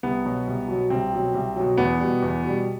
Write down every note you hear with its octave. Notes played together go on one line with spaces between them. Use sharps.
C2 B3
B2 F#3
C2
B2 F#3
C2 C4
B2 F#3
C2
B2 F#3
E2 B3
B2 G3
E2
B2
G3